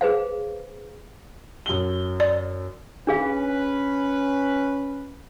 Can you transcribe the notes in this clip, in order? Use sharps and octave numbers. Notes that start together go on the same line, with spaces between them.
G#4 B4 C5 F5
F#2 G7
D5
C#4 D4 G#4 B4 F5